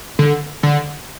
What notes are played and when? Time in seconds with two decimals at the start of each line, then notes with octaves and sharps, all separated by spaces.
0.19 D3
0.63 D3